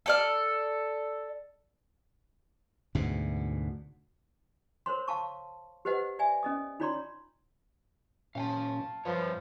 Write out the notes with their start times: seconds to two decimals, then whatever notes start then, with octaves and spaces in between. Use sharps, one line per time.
0.06 A4 D5 F6
2.95 D2 G#2 B2
4.86 A#4 C5 C#5 C6
5.08 F5 A5 C#6
5.85 G4 B4 C5 D#5 F#5
6.19 D5 E5 G#5
6.43 C#4 D#5 D#6
6.80 D#4 F4 C#5 D5 A#5 C6
8.35 A#2 C#4 F5 G5 A5
9.05 G2 F3 B4 C#5